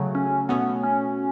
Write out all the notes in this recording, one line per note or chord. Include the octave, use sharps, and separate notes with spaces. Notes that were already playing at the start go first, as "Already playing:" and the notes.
Already playing: C#3 F#3 A3
C#4
B2 A3 B3 C#4 F#4
C#4